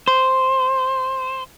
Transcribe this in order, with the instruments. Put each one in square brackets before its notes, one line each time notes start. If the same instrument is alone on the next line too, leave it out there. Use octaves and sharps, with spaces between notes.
[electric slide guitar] C5